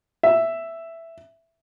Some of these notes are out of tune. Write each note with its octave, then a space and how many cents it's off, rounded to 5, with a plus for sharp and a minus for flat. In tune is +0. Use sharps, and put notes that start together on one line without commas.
E5 +5